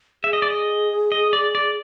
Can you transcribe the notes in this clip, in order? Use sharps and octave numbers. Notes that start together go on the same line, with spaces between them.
G#4 E5
D#5
D5
D#5
D#5
D5
D5